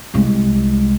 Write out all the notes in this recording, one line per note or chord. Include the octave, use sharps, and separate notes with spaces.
C2 G#3